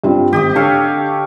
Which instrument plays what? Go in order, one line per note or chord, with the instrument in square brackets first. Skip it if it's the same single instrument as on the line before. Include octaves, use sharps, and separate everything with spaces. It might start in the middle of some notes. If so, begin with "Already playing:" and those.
[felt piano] G2 C4 F4
[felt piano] G#1 [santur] G4 D#5 D6
[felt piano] D3 [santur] A4 C#5 F5